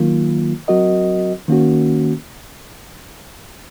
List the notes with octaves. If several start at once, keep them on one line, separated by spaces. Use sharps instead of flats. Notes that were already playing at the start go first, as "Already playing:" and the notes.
Already playing: D#3 F#3 A#3 F4
F#3 C4 F#4 A#4 D#5
D#3 A#3 C#4 F#4